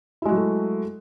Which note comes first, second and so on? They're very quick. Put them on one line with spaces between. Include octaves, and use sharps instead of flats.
E4 G#3 F#4 F#3 A3